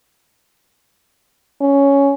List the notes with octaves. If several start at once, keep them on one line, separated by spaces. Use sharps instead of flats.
C#4